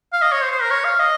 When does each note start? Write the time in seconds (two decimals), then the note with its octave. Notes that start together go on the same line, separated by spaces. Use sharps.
0.13 F5
0.22 D#5
0.32 C#5
0.41 C5
0.52 C5
0.61 A#4
0.71 C#5
0.85 F5
0.99 D#5